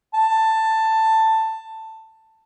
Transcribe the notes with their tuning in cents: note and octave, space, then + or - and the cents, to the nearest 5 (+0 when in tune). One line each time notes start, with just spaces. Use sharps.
A5 +10